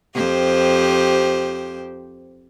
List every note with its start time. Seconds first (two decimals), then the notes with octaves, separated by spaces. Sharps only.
0.15 F2 G4 C5